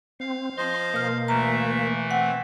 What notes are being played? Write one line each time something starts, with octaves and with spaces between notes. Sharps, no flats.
C4 F5
F3 C5 D#5 C6
B2 A#3 F6
D2 E3 A3 E5 A#5
C4 F#5 G5